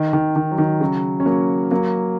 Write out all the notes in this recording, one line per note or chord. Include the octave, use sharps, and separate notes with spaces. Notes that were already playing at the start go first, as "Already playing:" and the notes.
Already playing: D#3
D#3
D#3
F#3
D#3
C#3 F#3
C#4
F#3 A#3
F#3 A#3